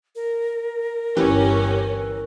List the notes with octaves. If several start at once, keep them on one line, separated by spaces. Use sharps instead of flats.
A#4
G1 E3 C#4 G4